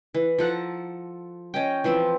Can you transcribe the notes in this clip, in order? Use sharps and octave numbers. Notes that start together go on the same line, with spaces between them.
E3
F3 A4 F#5 A#5
C#4 D#5 G5
E3 F3 C4